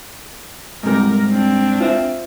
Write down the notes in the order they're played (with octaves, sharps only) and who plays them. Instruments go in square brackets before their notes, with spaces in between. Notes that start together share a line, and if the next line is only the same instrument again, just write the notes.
[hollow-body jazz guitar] G#2 C3 G3 [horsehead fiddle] A#4
[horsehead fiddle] C4 D4
[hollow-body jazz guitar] F4 C5 E5